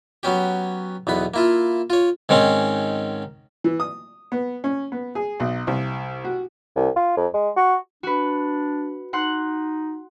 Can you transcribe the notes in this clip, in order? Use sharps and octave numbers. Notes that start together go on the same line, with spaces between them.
F#3 B3 C#4 G4
B1 E2 B3 B5
A#3 E4 F4
F4 C#5
G#2 D#3 C4 C#4
E3
D#6
B3
C#4
B3
G#4
B1
C2
F#4
C2
F4
F2
G#3
F#4
D4 F#4 B4
D#4 F#5 C6 F#6